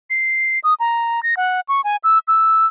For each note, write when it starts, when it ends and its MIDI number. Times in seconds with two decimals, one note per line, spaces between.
0.10 0.59 96
0.64 0.74 87
0.80 1.23 82
1.23 1.35 94
1.37 1.61 78
1.69 1.81 85
1.84 1.96 80
2.04 2.19 88
2.28 2.66 88